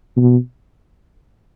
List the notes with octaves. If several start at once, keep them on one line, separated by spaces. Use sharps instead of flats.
B2